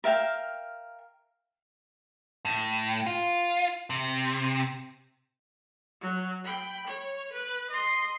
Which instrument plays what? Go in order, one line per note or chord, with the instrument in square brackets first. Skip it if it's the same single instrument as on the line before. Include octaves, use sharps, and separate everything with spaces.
[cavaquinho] A#4 E5 F5 G5
[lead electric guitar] A2
F4
C3
[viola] F#3
G5 B5
C#5
B4
D#5 C6